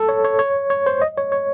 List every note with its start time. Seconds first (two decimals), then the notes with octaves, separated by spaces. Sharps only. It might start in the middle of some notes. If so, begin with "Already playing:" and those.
Already playing: A4
0.09 C#5
0.24 C#5
0.39 C#5
0.70 C#5
0.86 C5
1.02 D#5
1.18 C#5
1.32 C#5